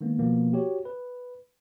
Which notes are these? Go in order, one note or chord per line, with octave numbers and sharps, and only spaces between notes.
D#3 G#3 A#3 B3
B2 F3 A#3 B3
F#4 G4 C#5
B4